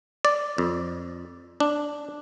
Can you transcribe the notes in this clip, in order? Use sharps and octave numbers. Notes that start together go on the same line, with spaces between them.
D5
F2
D4